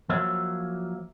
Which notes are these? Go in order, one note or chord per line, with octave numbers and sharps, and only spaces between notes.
F3 F#3 A#3 C#5 E5